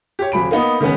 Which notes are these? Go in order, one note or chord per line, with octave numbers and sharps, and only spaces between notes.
G4 C#5
D#1 F#3 B5 D7
A#3 B3 D#4
D#3 G#3 B3 C#4 B4